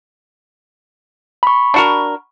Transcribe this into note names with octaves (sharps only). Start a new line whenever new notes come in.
B5 C#6
D4 F#4 A#4